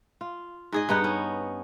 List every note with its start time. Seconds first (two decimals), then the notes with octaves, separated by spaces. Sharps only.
0.21 F4
0.72 G#2 G#4 D#5
0.89 G2 B3 D#4 F#5
1.04 C#4